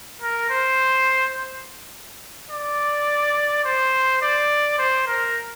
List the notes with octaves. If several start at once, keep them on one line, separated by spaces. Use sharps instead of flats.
A#4
C5
D5
C5
D5
C5
A#4